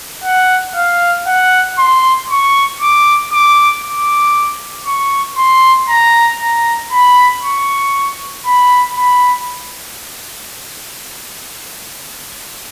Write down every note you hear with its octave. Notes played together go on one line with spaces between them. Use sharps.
F#5
F5
F#5
C6
C#6
D6
D6
D6
C#6
C6
A#5
A#5
B5
C#6
B5
B5